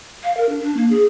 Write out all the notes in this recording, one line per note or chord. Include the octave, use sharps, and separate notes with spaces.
F5
A#4
D4
D4
A#3
G#4